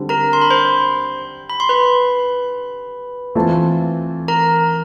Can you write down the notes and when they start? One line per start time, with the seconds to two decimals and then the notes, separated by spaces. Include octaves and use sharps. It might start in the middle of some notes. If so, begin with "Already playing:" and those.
Already playing: D3 G3 C4
0.09 A#4 A#5
0.33 C6
0.42 B5
0.51 C5 C6
1.50 B5
1.60 C6
1.69 B4 B5
3.35 E3 A3 C4 F4 A4
4.28 A#4 A#5